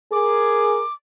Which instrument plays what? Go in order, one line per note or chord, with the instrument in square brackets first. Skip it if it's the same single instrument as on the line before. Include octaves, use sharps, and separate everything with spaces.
[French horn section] G#4 A#4 [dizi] D6